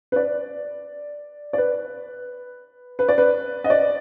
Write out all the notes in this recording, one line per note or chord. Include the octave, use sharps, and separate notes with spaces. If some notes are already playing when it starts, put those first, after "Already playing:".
B4
D5
D5
B4
B4
D5
B4
D#5
D5